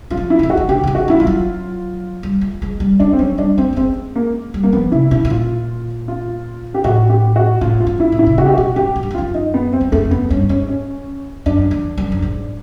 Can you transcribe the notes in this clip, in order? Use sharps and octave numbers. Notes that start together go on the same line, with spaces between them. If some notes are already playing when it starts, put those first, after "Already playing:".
F#3 F4
F3
E4
E3
D#3
F#4
D#3
D3 G4
D3
D#3
F#4
E3 E4
G3 F4
F#3
G3
A3
G#3
G3
G#3 D4
C4
F#3 C#4
G3 D4
A3 C4
A3
G#3 C4
A#3
G3
A#3
F3 B3
C3 E4
B2 E4
B2
A#2 F4
F4
G4
A2 F#4
G4
F#4
A2 F4
F4
G#2
E4
A2
E4
C3
C#3 F#4
G4
B2 F#4
G#2 G4
G2
F#2
F2
F#2 F4
D#4
B3
C4
E2
F2 A3
F#2 B3
G2 C#4
G#2 C#4
C#4
F#2 D4
E2
F#2
G2
G#2